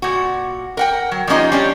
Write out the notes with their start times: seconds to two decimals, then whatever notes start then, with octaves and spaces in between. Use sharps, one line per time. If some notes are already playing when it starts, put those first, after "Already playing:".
0.02 A#2 F#4
0.77 A#4 F#5 G5
1.12 F#3
1.27 F3 G3 A#3 C#4 D#4 F4
1.52 G3 C#4 D4